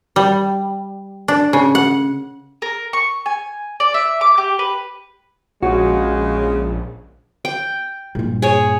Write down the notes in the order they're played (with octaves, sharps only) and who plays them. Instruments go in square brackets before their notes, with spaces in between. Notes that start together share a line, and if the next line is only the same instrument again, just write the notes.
[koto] G3
D4
C#3
F#5
[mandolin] A#4
C#6
G#5
D5
E5
D6
G4
B4
[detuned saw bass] A#1 [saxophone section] C#3 [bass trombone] G#3 [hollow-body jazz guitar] F#4
[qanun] G5
[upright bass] G2 A#2
[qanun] G#4 C#5